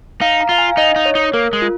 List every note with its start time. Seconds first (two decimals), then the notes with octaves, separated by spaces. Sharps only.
0.21 D#4 F5
0.41 A#5
0.49 F4 F5
0.58 G#5
0.69 F5
0.77 D#4 D#5
0.96 D#4
1.06 C#5
1.15 D#4
1.33 A#3 A#4
1.53 G#3
1.62 F4